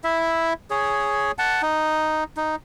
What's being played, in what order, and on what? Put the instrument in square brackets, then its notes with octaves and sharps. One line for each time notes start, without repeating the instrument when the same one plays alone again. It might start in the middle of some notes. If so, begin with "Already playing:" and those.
[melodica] E4 E5
G#4 C#5
F#5 A5
D#4
D#4